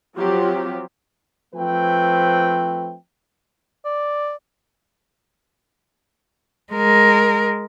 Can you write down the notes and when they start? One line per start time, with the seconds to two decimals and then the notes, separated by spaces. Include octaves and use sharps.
0.17 F3 F#3 C4 F4 G4
1.55 F3 A3 C4 B4 G5
3.85 D5
6.73 G#3 A#4